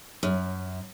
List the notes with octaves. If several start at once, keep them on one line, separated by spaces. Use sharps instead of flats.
F#2